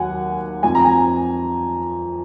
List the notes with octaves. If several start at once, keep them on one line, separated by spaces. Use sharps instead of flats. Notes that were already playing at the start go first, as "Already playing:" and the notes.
Already playing: D#2 D#3 F#3 F#5 G#5
F2 F3 G#5
A#5
G#5